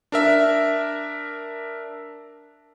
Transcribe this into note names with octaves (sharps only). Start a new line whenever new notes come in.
D4 A#4 E5